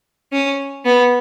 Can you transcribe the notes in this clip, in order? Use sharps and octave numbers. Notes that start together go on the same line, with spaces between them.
C#4
B3